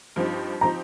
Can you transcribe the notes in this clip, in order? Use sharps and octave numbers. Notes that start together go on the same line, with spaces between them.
G2 F3 C4 D#4 G4
F3 C4 D#4 G4 A#5